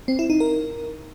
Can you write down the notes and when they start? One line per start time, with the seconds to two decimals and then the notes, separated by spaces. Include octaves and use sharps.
0.08 C4
0.19 E4
0.30 D#4
0.40 A#4